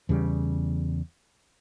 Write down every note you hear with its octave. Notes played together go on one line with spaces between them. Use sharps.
E2 C#3 G3